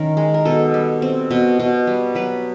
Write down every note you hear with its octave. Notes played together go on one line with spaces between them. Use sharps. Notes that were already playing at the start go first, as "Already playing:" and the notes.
Already playing: D#3 C#4 A#4
G#3
A#4
B2 A4
G3
C4
B2
B2
G3
F#3 B4